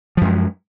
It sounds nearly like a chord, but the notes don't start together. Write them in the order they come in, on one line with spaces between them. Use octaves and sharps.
F3 F#2 G#3